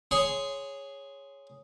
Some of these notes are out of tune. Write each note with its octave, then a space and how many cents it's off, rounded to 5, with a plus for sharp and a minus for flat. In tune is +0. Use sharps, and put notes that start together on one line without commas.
G#4 +0 C#5 +0 C6 -10